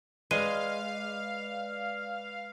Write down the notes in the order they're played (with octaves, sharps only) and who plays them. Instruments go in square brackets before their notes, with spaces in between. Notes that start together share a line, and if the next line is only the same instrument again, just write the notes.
[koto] G#3 [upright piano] B4 D5 [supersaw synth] F5 [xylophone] D#7